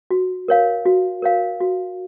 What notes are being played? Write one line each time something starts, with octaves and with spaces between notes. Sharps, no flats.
F#4
A#4 C#5 F5
F#4
A#4 C#5 F5
F#4